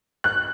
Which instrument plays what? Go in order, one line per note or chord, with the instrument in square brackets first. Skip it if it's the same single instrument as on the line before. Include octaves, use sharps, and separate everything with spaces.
[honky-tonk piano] F#6